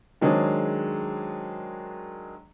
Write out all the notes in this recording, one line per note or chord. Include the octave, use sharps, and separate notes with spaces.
D#3 F#3 G#3 D4 G#4 C5